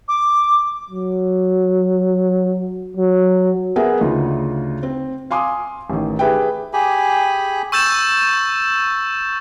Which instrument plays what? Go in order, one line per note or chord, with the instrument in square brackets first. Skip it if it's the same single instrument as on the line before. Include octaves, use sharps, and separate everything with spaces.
[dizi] D6
[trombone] F#3
F#3
[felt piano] B3 G#4 A#4 E5 F#5
D2 C#3 D#4 F4
C4
F5 G#5 C6 D6 D#6
A1 D#3
G4 G#4 B4 E5 G5
[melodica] G4 G#4 G#5 B5
[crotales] C#6 E6 G6 A6 E7